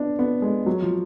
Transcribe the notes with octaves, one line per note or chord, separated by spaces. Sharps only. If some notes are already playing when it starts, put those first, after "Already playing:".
Already playing: B3 D4
B3
G#3
F#3
F3